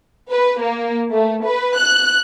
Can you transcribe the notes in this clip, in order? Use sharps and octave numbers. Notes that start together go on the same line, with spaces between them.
B4
A#3
A3
B4
F#6